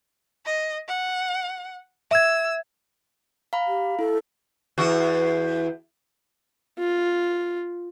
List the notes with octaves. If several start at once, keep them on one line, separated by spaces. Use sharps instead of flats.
D#5
F#5
E5 E6 G#6
F5 A#5 B5
G4
E4 A4
E2 F#4
F4